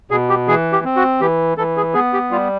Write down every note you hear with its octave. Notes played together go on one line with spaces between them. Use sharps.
B2 G#4
G4
E3 G#4
G4
C4
F#4
E3 G4
E3 A4
G#4
B3 G#4
G4
G3 F4